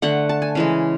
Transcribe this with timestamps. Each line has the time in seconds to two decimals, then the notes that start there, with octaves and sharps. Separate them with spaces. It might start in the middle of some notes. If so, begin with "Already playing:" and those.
0.02 D3 A3 F#5
0.29 A5
0.42 G#5
0.55 C#3 E3 G#3